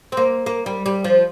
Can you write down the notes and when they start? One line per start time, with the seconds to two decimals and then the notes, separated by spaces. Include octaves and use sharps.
0.12 C4
0.17 A#3
0.46 A#3
0.66 G3
0.86 G3
1.04 F3